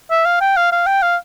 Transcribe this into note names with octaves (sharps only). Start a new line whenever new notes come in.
E5
F5
G5
F5
F5
G5
F5